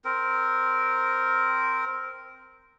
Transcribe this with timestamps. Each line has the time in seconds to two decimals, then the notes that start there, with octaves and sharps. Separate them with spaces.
0.05 C4 A#4